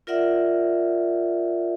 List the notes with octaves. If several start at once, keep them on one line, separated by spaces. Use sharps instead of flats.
F4 A#4 D5 E5 F#5